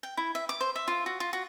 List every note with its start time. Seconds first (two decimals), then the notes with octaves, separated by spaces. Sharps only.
0.03 G5
0.17 E4
0.35 E5
0.49 D6
0.61 C5
0.76 E5
0.88 F4
1.06 F#4
1.20 F4
1.33 F#4